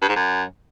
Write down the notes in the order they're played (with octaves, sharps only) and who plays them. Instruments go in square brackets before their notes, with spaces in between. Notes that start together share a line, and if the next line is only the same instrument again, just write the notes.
[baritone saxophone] G2
G#2
F#2